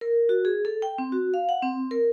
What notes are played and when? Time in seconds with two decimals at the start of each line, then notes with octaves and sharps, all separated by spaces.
0.01 A#4
0.29 F#4
0.45 G#4
0.65 A4
0.82 G5
0.98 C4
1.12 F#4
1.34 F5
1.49 F#5
1.62 C4
1.91 A#4